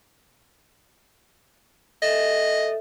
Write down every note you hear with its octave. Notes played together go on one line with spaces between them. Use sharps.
A4 D#5 E5